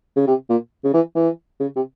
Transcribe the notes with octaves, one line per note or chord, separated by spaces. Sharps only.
C#3
C3
A#2
C#3
E3
E3
C#3
C3